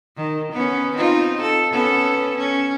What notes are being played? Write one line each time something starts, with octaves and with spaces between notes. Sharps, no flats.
D#3
B3 C#4
C4 D#4 F4
A4
B3 C#4 A4
C#4